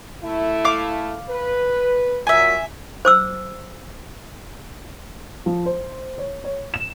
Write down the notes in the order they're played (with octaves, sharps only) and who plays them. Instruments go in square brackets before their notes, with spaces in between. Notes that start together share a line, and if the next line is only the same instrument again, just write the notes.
[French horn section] A3 E4
[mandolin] F5 D6
[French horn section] B4
[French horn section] A#2 F#3 [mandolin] E5 G#5
[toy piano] C5 D6 E6
[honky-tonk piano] F3
C5
C#5
C#5
E7